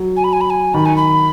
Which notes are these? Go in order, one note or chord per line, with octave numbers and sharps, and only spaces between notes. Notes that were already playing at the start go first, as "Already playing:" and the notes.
Already playing: F#3
G#5
B5
G#5
B5
G#5
D#3 B5
G#5
B5